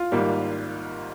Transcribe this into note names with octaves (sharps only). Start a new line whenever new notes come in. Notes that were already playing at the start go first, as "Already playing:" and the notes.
Already playing: F4
G#1 G#2 G3 A#3